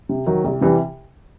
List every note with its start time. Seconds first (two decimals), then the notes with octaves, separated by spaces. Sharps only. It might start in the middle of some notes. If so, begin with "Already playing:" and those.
0.09 C3
0.26 D#3 F#3
0.44 C2
0.61 C3 E3 G3